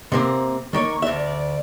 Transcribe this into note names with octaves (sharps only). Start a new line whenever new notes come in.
C3 A#3 C4
D#3 A#3 C#5 C#6
D2 D5 E5